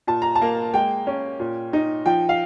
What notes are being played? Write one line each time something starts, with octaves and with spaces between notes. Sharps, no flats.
A#2 A5
A#5
A5
A#3
G#3 G5
C#4
A#2
D#4
F3 G5
F5